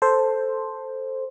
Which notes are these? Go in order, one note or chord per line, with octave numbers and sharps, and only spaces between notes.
A4 C5